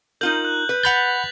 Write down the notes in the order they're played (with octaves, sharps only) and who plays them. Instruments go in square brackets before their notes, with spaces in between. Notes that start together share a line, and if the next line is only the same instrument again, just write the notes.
[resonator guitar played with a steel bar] D#4 F4 A#4 [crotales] G6 F#7
[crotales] F#6
[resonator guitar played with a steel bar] B4
[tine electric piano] F#5 B5 G6 [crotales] A6 B6 F7